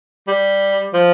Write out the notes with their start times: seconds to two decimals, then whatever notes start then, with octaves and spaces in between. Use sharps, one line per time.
0.28 G3
0.94 F3